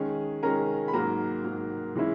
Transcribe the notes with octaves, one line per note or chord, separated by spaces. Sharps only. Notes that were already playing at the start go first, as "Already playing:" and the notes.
Already playing: D#3 G#3 C#4 G#4
D#3 G#3 C#4 A#4 A#5
B5
G#2 F#3 A#3 A#4 A#5
G#2 F#3 A#3
E3 G#3 C#4 E4